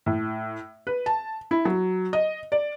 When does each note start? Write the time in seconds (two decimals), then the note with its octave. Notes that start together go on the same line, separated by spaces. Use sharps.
0.06 A2
0.87 B4
1.06 A5
1.51 E4
1.65 F#3
2.13 D#5
2.52 D5